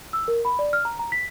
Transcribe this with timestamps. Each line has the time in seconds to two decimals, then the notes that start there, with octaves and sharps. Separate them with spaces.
0.13 E6
0.28 A#4
0.45 B5
0.59 D5
0.73 F6
0.85 A#5
0.99 A#5
1.12 B6